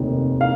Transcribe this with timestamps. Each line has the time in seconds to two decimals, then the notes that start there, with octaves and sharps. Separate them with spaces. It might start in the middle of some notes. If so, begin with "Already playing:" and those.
Already playing: F1 D#2 D#3
0.41 F5